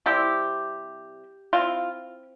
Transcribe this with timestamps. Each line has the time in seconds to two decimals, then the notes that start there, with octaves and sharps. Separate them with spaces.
0.06 C3 G3 C4 E4 G4
1.53 C4 E4 F4